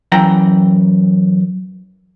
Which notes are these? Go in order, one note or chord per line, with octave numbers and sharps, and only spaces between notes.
F#2 E3 G5 A#5